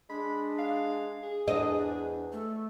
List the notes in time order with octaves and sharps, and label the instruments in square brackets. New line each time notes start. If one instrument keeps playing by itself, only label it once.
[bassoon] G#3 [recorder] D4 [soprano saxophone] B5
[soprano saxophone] F5
G#4
[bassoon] E2 [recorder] D4 [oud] D#5
[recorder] A3